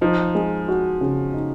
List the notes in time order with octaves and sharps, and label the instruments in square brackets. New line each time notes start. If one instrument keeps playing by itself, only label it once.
[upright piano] F3 [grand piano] D#4
[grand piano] G#3
F#4
C#3
D#4